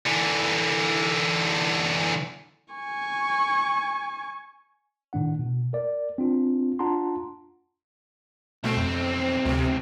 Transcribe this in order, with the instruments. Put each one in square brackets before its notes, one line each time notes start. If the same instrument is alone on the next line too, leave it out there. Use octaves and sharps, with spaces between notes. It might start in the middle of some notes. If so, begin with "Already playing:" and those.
[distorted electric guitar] D3 E3
[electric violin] G#5 C#6
[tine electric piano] A2 D#3 D4 F#5
B2
A#4 D5
C4 D4 F4
D4 F4 F#5 A5 A#5 C6
[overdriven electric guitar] B1 C4 [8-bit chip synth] B2 A3
[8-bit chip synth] F2
D2 C3